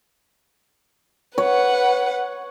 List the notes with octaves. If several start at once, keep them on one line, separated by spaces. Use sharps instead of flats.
B4 C#5 F#5